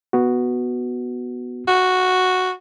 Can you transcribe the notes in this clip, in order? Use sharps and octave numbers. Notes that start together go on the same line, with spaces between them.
B3 F#4
F#4